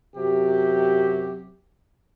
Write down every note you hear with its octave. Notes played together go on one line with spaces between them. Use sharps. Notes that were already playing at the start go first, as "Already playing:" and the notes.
F#2 C3 F#3 G4